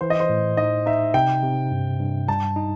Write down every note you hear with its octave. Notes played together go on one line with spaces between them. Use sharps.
E3 C5
D#5
C5
A2
D#4 D#5
D#4 E5
C3 G5
C3
G2
G2
G3 A5
D#4